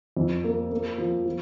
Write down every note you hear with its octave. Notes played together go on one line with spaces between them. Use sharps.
F2
A#3
A#3
F3
F3